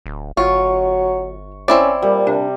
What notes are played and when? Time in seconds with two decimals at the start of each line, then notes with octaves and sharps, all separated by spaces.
0.06 D1
0.37 G1 F#3 F4 C#6
1.68 C4 C#4 E4 D5
2.02 A#2 G3
2.27 C3 D4